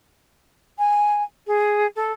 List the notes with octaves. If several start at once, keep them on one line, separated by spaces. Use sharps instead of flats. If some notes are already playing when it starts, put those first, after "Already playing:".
G#5
G#4
A4